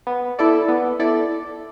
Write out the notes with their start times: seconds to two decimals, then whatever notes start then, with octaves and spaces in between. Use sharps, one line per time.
0.07 B3
0.39 E4 A4 D5
0.68 B3
0.99 E4 A4 D5